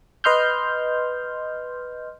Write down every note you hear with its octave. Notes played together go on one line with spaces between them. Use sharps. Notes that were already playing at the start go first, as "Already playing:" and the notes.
B4 D#5 C6 F6 G6